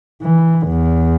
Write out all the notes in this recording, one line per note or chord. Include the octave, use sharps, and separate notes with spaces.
E3
E2